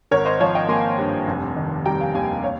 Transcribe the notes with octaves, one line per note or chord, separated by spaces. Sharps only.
G#1 A#4 C#5
C5 D#5
F3 C#5 F5
D#5 G5
A#3 G#5 C6
G2
F1
D#3
G3 G5 A#5
F5 G#5
D#2 F5 G#5
C#5 F5